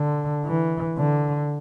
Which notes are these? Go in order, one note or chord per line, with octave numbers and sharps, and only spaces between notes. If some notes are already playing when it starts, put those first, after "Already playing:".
Already playing: D3
E3
D3